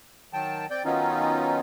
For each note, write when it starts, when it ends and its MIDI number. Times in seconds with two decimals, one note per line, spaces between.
0.33 0.66 51
0.33 0.66 54
0.33 0.66 79
0.33 0.66 81
0.71 0.83 60
0.71 0.83 74
0.71 0.83 79
0.71 0.83 91
0.85 1.60 51
0.85 1.60 54
0.85 1.60 59
0.85 1.60 61
0.85 1.60 63
0.85 1.60 65